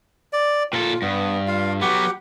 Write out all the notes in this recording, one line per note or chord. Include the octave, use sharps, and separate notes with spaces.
D5
A#2 F4 A4
G2 B3
F4 F5
F#3 B3 G4 F#5